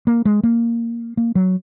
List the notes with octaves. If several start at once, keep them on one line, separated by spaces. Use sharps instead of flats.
A#3
G#3
A#3
A#3
F#3